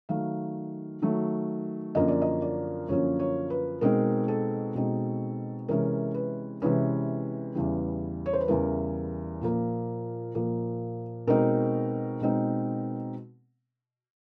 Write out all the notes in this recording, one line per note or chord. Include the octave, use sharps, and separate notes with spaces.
D#3 F#3 A3 F5
D#3 F#3 A3
F#2 D3 F3 A#3 C#4 D#5
D5
D#5
D5
F#2 D3 F3 A#3 C#4 C#5
C#5
B4
B2 G#3 C4 D#4 A#4
A4
B2 G#3 C4 D#4
C3 E3 G#3 C#4 A#4
B4
C3 E3 G#3 C#4 B4
E2 C#3 E3 G3
C#5
C5
B4
E2 C#3 E3 G3 A#4
A#2 F3 A#3
A#2 F3 A#3
B2 G#3 C4 D#4 A#4
B2 G#3 C4 D#4